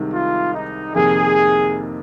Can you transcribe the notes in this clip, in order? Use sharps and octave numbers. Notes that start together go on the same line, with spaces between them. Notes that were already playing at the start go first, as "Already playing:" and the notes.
Already playing: C2 C3 D#3 G#3
F4
D#4
F2 C3 D#3 A#3 G#4